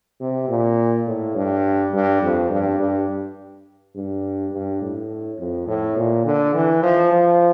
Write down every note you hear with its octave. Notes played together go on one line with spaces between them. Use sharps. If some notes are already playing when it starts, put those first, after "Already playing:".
C3
A#2
A2
G2
G2
F2
G2
G2
G2
G2
A2
F2
A2
A#2
D3
E3
F3
F3